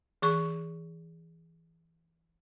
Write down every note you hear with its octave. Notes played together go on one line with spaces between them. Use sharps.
E3 G#4 C#6